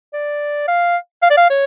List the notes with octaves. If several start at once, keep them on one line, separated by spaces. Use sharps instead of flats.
D5
F5
F5
D5
F5
C#5